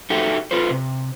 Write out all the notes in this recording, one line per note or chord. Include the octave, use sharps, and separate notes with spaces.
D#4 F#4 G4 A4 E5
F4 A4 B4 C5
C3